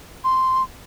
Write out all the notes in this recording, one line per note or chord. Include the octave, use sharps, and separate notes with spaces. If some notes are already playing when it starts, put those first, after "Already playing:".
C6